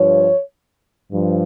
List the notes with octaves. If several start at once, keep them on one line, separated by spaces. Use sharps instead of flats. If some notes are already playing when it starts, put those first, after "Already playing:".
Already playing: G2 F3 C#5
G2 F3